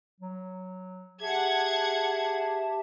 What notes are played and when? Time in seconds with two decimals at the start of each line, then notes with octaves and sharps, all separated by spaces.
0.20 F#3
1.21 G4 G#4 E5 F#5 A5 G#6